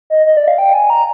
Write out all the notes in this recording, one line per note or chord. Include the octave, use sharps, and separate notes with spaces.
D#5
D#5
D5
F5
G5
G#5
A#5